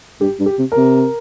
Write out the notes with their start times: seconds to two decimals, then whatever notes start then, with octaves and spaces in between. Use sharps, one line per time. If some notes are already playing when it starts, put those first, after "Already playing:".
0.21 G2 G4
0.39 G2
0.46 G4
0.59 C3
0.72 A#4
0.77 C3